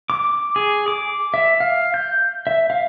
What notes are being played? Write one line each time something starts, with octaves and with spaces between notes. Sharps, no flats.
D6
G#4
D6
E5
F5
G6
E5
F5